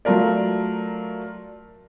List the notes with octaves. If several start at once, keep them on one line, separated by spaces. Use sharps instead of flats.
F#3 A3 F4 A#4 D5